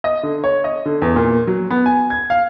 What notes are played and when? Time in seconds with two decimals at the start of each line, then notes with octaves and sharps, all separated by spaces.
0.04 D#5
0.23 D3
0.44 C#5
0.64 D#5
0.86 D3
1.02 E2
1.16 A#2
1.47 F#3
1.71 B3
1.86 G#5
2.10 G#6
2.30 F5